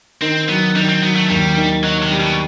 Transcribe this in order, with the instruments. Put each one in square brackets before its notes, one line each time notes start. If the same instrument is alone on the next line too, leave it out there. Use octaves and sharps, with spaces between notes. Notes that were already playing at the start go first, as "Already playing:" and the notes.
[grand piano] D#3 [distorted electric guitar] C4
[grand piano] F#3 [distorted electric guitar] B3
[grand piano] D#3 [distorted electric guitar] G3
[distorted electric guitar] C4
[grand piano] F#3 [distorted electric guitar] B3
[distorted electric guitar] A3
[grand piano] D#2 [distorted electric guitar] G3
[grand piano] D#3
[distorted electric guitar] F#3 [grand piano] D#4
[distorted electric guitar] C3
[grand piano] G3
[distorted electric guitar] B2